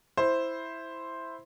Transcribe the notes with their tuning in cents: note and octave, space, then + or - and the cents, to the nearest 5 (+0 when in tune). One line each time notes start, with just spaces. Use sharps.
E4 +0 C5 +0